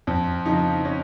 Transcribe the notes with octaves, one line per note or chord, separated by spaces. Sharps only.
F2 C4
C#3 F3 D#4
C#4